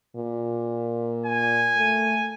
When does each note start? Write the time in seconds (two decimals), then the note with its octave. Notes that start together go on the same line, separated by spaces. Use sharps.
0.16 A#2
1.26 G#5
1.77 A3